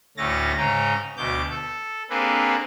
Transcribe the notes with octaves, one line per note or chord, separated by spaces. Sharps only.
D2 A2 A3 C#4 A6 A#6
G#2 C#3 C#4 G5 A#5
D2 B2 D6 G6
A4
A#3 C4 D4 G#4 A4 B4